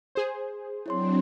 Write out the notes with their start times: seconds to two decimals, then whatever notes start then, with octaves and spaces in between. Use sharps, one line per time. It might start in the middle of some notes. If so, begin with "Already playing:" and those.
0.15 G#4 C5
0.86 F#3 C4 D4 E4 C#5 C6